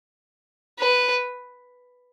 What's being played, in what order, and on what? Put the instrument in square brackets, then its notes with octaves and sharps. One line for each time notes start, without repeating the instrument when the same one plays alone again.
[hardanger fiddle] B4